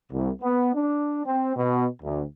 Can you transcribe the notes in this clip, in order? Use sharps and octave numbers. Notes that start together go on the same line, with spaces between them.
C2
B3
D4
C4
B2
D2